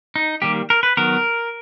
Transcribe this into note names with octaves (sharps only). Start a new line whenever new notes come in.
D#4
D#3 G3 A#3 G4
A#4
B4
D#3 F#3 B3 A#4